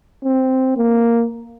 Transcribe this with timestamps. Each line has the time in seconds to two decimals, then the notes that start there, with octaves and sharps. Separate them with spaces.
0.24 C4
0.77 A#3